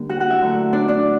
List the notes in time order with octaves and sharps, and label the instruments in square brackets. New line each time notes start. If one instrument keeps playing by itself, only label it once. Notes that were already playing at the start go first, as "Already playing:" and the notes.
Already playing: [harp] D3 G3 A#3
F#4 F#5
F#4 F#5
E4 E5
D3 F#3 A3
D4 D5
D4 D5